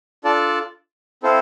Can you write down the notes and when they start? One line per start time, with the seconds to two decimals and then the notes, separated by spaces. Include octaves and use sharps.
0.24 D4 F4 A4 D5 A5
1.23 C4 E4 A4 C5 F5